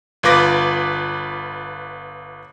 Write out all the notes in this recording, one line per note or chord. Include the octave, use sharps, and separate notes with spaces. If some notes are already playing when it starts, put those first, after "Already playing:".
G1 F4 B4 D6 A#6